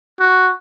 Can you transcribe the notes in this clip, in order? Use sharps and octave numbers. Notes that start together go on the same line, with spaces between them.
F#4